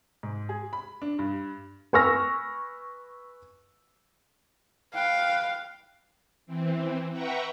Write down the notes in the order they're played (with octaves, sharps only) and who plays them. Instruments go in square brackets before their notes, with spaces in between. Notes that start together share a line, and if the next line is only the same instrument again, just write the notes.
[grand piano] G#2
G#4
B5
D4
G2
[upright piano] B4 G#5 C#6 E6 F6 A#6
[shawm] B4 [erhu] F5 [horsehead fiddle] G5
[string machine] E3 C4
B4 E5 F#5 G5 A#5 C#6